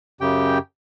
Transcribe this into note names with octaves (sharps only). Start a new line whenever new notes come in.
F#2 C#3 G4 G5